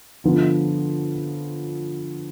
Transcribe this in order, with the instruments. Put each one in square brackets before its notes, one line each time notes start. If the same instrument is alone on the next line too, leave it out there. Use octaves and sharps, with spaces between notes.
[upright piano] D3 F3 B3 F4